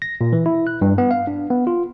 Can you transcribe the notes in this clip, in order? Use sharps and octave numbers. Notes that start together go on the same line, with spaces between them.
A#6
A#2
E3
E4
F#6
G2
B3
F5
D4
B3
F4